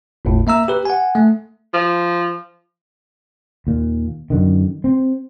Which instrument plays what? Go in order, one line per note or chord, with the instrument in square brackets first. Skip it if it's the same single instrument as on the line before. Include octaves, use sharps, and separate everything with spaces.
[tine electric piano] G1 D#2 A2
A#3 E5 A#5 E6
G4 B4
F#5 G#5
A3
[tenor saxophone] F3
[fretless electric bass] D#2 A#2
F#2 D3 D#3
C4